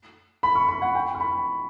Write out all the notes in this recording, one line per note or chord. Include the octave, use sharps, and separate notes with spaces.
B5
C#6
B5
F#5
G5
C#6
B5